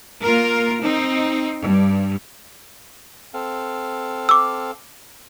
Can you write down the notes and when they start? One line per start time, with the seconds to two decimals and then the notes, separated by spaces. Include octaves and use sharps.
0.24 A#3 F4 A#4
0.83 C4 D#4
1.60 G2
3.34 C4 A4 F5
4.29 D6 E6